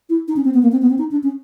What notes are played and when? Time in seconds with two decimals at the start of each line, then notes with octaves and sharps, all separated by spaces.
0.10 E4
0.28 D#4
0.36 C#4
0.45 C4
0.54 B3
0.63 A#3
0.72 C4
0.82 B3
0.90 C4
0.98 D#4
1.11 D4
1.23 C#4